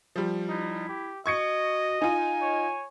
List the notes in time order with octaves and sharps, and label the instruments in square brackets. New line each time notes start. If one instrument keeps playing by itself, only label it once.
[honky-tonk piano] F3 G3
[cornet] D#4 [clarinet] E4
[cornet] G4
[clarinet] F#4 [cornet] D#5 [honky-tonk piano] C#6 G#6 C#7
[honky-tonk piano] D#4 F4 [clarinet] G#5
[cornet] C#5